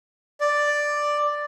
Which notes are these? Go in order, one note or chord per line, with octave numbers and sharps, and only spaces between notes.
D5